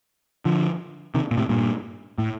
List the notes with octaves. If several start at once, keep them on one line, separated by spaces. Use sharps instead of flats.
D3 F3
C3 D#3
A#2
A2 C3
G2 A#2
A2